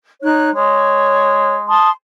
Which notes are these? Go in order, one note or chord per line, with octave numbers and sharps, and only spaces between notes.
D#4 C#5 F#6
G#3 C#5
A5 C6 D#6